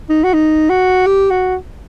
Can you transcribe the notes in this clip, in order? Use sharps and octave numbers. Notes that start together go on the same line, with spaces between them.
D#4
F#4
D#4
F#4
G4
F#4